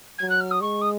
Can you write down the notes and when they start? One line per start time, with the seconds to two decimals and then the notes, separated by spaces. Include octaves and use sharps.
0.18 F#3 G#6
0.30 F#6
0.40 F6
0.51 D#6
0.61 G#3 C#6
0.81 D#6